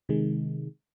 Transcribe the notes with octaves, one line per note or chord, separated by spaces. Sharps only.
C3 D#3 G#3